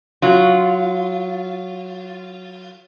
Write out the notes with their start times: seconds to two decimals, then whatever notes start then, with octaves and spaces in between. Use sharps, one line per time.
0.22 F#3 F4